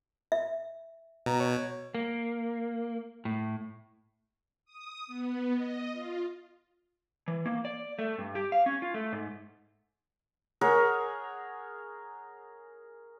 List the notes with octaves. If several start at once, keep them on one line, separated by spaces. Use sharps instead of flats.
E5
B2 A#5
C#5
A#3
A2
D#6
B3
D#5
F4
E3
A#3
D5
A3
G2
G4
F5
C#4
F4
A3
G#2
G#4 A#4 C#5 F#5